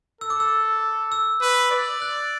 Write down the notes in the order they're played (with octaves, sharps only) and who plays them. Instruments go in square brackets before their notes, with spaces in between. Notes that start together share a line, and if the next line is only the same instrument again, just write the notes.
[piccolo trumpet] A4 [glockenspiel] E6
[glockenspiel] D6
E6
E6
[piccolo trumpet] B4
D5
[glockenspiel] F#6